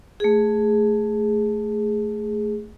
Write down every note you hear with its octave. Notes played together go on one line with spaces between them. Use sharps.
A3 G#4